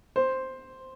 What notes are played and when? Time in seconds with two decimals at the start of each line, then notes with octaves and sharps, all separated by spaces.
0.16 C5